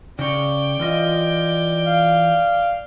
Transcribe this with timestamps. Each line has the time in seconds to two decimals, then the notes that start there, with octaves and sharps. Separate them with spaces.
0.19 C#3 C#5 D5 G5
0.80 E3 F4 D#5
1.87 F5